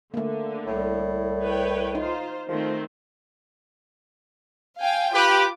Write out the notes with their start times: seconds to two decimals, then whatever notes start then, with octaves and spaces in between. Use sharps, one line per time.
0.14 D3 A3 A#3
0.67 C2 A2
1.42 B4 C#5 G5
1.95 D#4 F4 C5
2.49 D#3 F3 A3 C4
4.81 F5 G5 G#5
5.14 F4 G4 B4 D6